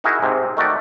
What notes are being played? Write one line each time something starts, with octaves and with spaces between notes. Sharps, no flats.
D#4 E4 F#4 G#4 A#4 E5
G#2 C3 C4
D#3 A3 F#4 D5